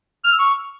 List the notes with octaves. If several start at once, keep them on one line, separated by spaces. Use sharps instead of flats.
F6
E6
C#6